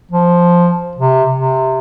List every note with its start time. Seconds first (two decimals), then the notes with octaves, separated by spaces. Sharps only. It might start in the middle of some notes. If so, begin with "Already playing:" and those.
0.11 F3
0.97 C3
1.34 C3